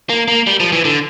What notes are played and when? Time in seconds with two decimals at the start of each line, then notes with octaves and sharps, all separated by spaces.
0.10 A#3
0.28 A#3
0.47 G3
0.60 F3
0.72 E3
0.85 D3